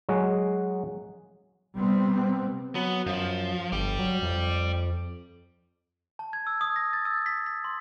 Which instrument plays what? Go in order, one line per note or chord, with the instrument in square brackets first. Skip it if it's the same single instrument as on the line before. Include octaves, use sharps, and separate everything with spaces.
[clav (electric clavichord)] F#3 G#3 F#4 G#4
[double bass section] C3 G3 B3 C4
[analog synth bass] F#3 [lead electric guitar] B3
[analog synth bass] F#2 [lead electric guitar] F3
[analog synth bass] G1 [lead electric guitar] D5 G5
[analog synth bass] F#3
F2
[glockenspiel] A5
G#6
E6
D#6
A#6
A6
E6
B6
B6
C6